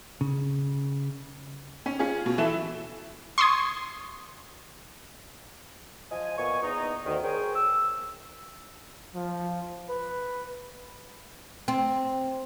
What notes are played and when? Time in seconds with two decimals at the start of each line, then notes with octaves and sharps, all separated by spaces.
0.21 C#3
1.86 C#4
1.99 C#4 F4 G#4
2.26 B2
2.38 E3 A4 E5 E7
3.38 C6 C#6 D#6 G#6
6.11 F3 C5 D#5 G#5
6.38 A#2 B3 D#5 G#5 C#6
6.63 E2 D#4
7.06 D2 D#3
7.24 G#4 A#4 C5 C#5 G5 G#5
7.56 E6
9.15 F3
9.90 B4
11.68 C4